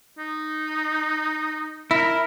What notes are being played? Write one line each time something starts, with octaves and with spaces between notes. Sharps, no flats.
D#4
E4 A#4